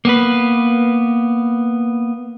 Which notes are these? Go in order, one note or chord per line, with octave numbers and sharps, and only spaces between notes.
A#3 B3 B4